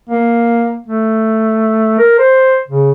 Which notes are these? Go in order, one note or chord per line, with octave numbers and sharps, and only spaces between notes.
A#3
A3
A#4
C5
C#3